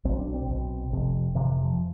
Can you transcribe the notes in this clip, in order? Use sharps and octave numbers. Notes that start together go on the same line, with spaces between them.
B1 B2 C4
D4
C4
B1 B2
F1 F2 C3
F1 F2 C3 E3
F3